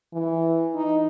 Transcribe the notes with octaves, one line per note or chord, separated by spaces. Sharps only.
E3
D#4